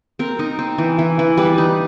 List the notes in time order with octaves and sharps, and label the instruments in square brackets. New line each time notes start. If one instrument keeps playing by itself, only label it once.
[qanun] C4 A#4
D#4
C4
E3
E3
E3
G3 B4
D#4